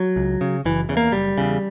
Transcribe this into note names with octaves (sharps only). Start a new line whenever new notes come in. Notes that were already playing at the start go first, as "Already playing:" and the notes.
Already playing: F#3
C#2
C#3
F#1 E3
E2 C#3
A#3
F#1 G3
E2 C#3